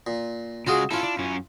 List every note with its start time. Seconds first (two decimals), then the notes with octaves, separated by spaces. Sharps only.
0.07 A#2
0.67 C#3 G#3 F4 F#4 G#4
0.91 C#4 E4 F4 A4
1.03 D4
1.19 F#2 C#4